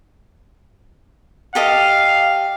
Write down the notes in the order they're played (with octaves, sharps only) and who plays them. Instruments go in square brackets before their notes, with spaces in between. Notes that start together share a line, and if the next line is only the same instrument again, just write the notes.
[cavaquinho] G4 A4 D#5 [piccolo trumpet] F5